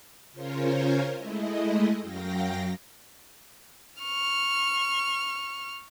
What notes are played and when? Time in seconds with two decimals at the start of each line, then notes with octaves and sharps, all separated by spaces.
0.32 C#3 C#4 F4 A#4 C5 C#5
1.16 G#3 A3 E4 D#5
2.01 F#2 F#3 F5 G5 A#6
4.02 C#6 F6